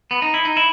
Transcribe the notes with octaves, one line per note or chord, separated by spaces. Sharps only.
B3
D#4
E4
D#4
E4